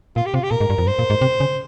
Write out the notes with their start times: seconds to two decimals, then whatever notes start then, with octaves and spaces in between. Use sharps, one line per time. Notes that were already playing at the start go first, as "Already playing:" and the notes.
0.16 A#2 F4
0.26 G4
0.34 C3 F4
0.43 G4
0.51 A#2 A#4
0.61 G#2
0.70 G2
0.78 F2
0.86 G2 C5
0.99 A#2
1.10 G#2
1.21 C3
1.40 C#3